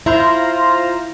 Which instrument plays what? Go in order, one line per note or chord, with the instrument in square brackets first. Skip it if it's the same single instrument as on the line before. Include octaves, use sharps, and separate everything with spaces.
[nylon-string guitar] E4 [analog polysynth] F4 C5 A#5